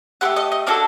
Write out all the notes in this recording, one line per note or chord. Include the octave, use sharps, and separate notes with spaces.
A3 C4 G4 F#5
D#5
D#5
A#3 D4 F#4 A4 D5